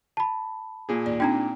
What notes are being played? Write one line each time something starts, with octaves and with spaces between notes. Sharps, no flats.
A5 B5
A#2 G#4
D#2 D5
C4 D4 D#4 G5 A#5